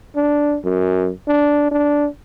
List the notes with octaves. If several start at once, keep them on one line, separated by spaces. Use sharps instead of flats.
D4
F#2
D4
D4